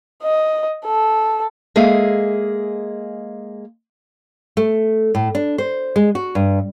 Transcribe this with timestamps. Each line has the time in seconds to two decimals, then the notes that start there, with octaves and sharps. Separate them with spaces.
0.23 D#5
0.85 A4
1.76 G#3 A#3 G#4 A4 E5 F5
4.57 A3
5.15 A2
5.35 D4
5.58 C5
5.96 G#3
6.15 F#4
6.35 G2